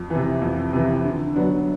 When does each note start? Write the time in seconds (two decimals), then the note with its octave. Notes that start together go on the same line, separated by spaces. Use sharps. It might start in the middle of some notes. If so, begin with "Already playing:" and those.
Already playing: F2
0.10 C3 E3
0.42 F2
0.73 C3 E3
1.04 D3
1.34 F#3 B3 D4